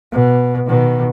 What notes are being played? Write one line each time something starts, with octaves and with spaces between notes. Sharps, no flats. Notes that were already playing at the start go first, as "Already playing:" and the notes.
B2
B2 D#3